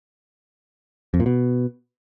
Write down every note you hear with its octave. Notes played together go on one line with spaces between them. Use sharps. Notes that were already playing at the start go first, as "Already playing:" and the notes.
F2
A#2
B2